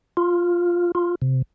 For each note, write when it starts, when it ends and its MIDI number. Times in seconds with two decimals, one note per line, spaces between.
0.17 0.92 65
0.95 1.15 65
1.22 1.42 48